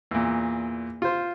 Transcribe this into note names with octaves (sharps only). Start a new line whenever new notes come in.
E2 A#2
F4 C5